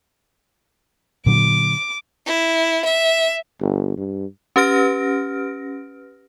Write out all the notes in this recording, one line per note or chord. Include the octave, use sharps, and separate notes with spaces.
A#2 D3 F#3 D6
E4
E5
G1
G2
C#4 G4 B4 F6 A#6 D7